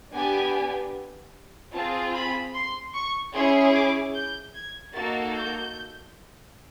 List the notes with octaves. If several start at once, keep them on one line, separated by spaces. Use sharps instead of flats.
B3 D4 G4 G#5
C4 F4 G#4 A5
B5
C6
C#6
C#4 E4 G#4 C6
D6
G6
G#6
A#3 D#4 F#4 A4 A6
G6